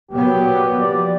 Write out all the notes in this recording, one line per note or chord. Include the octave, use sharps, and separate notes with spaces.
A#2 F#3 B3 G4
F3 D5